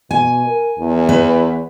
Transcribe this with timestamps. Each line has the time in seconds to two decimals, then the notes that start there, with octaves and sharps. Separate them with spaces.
0.11 B2 G#5
0.45 A#4
0.79 E2
1.09 B4